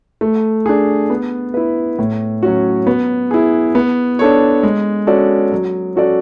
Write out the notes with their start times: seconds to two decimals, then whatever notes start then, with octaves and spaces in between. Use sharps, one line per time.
0.21 A3
0.66 D4 G#4
1.10 B3
1.54 E4 B4
1.99 A2
2.43 F#3 C#4 F#4
2.87 B3
3.31 E4 G#4
3.75 B3
4.19 D4 A4 C#5
4.63 G#3
5.07 C#4 F#4 A4 D5
5.52 F#3
5.96 C#4 F#4 A4 D5